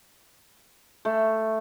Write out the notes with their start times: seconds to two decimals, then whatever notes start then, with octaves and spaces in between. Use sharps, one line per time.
1.05 A3